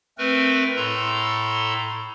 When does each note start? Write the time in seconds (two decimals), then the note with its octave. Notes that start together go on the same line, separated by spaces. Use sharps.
0.18 A3 C4 A#4 B4
0.76 A2 A4 A#5 C6